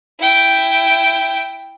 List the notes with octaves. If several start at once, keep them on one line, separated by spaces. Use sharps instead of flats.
E4 G5